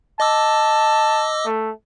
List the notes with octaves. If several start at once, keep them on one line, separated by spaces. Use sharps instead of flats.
D#5 A5 D6 E6
A3